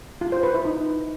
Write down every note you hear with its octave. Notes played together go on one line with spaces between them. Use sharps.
F4
C5
B4
E4
D#4